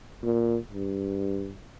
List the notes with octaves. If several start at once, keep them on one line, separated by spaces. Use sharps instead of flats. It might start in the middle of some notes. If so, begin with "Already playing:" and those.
A#2
G2